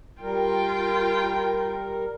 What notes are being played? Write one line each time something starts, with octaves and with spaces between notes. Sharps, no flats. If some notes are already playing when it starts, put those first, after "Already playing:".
G3 F4 A#4 G5